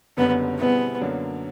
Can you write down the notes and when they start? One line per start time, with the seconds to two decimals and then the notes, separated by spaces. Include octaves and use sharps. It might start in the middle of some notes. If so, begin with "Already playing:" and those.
0.17 F#1 F#2 D3 G3 B3
0.59 B2 G3 B3 C4 E4 G#4
1.00 F#2 D3 F#3 A#3 D4